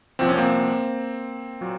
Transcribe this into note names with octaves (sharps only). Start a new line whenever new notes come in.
C2 A#2 F3 C4
C#4
A#3 C4
A#2 F#3